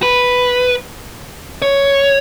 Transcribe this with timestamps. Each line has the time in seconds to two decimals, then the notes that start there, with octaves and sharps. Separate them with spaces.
0.03 B4
1.62 C#5